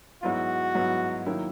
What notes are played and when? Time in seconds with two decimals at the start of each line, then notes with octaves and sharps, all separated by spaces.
0.23 G#2 F#3 B3 E4 F#4
0.75 G#2 F#3 B3 E4
1.26 D#3 F#3 A#3 E4